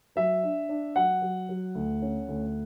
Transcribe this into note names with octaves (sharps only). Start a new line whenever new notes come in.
F#3 E5
D4
D4
F#3 F#5
F#3
F#3
D2
C#4
D2